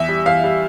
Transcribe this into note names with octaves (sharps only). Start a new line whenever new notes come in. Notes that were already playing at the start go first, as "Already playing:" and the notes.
Already playing: E2 E5
G3
E2 F5
G3